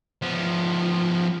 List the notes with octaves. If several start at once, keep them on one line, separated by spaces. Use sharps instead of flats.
F3 B3